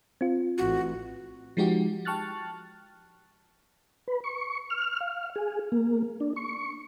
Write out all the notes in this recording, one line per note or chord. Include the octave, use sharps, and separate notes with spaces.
C4 F4
A1 F#4
F3 G#3 D#4 F#4 G4
G5 A5 C#6 F6 F#6 A6
B4
C#6
F6
F5
G#4
A#3
D4
C#6